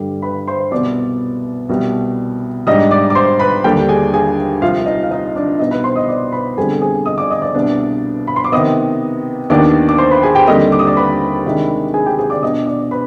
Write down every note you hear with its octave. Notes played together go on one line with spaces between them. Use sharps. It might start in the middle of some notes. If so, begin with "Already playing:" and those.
Already playing: G2 D3 G3
B4 B5
C5 C6
C2 B2 B3 D5 D6
C2 B2 G3
G#2 G3 D4 D#5 D#6
D5 D6
D6
C5 C6
B4 B5
D#2 D3 G3 D4 G4 G5
G#4 G#5
G#4 G#5
C2 C3 F3 F4 F5
D#4 D#5
F5
D#4 D#5
D4 D5
C2 B2 B3 D#4 D#5
B4 B5
C5 C6
D#5 D#6
D5 D6
B4 B5
F2 D3 G3 B3 G#4 G#5
G#4 G#5
D#5 D#6
D5 D6
D#5 D#6
D5 D6
C2 B2 B3 D4
B5
C6
D6
C3 D#3 B3 D#5 D#6
D#2 D#3 B3 D4 D5 D6
D6
C5 C6
B4 B5
G#4 G#5
G4 G5
D#2 D3 G3 C4 D#5 D#6
D6
D#6
D5 D6
B4 B5
C3 D#3 G#3 D4
G#4 G#5
G4 G5
G#4 G#5
D5 D6
B2 B3 D4 D#5 D#6
D5 D6
B4 B5